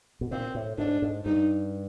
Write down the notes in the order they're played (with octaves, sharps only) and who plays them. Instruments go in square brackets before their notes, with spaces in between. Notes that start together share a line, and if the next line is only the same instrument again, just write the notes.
[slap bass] B2
[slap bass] A#2 [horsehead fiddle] C4
[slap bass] A2
[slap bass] G#2 [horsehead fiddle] D4
[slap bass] G#2
[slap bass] G2 [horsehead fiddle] D#4